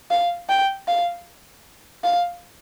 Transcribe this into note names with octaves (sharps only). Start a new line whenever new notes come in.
F5
G5
F5
F5